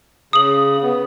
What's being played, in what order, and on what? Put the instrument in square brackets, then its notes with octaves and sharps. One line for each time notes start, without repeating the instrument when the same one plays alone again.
[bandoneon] C#3 [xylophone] D#6 F#7
[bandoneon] B3